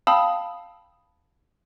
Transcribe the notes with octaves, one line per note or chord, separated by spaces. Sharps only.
F5 G5 A5 B5 D#6 E6